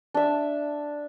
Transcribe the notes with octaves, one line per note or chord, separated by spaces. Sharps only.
D4 E5